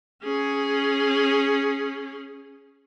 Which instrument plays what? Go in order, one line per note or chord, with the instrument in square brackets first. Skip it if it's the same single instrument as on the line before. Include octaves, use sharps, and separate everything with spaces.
[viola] C#4 G#4